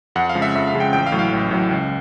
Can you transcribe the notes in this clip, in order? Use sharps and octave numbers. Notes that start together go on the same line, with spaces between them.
F2 F#5
F5
C#3 F3 G#3
E5
F2 E5
F5
C#3 F3 G#3
G5
A1 G5
F5
A2 F#3
F5
A1
A2 F#3
C#2